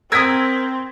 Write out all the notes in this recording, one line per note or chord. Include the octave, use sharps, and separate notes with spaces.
C4 A#4 D#6 E6 G#6 B6